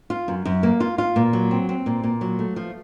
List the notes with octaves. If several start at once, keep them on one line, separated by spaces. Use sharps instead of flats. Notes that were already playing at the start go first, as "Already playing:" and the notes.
F4
F#2
F#2
A#3
F4
F4
A#2
F#3
C4
C4
A#2
A#2
F#3
A3
F3